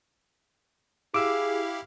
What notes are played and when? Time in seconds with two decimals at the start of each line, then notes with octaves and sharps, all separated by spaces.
1.14 E4 G4 G#4 F5 D6 E6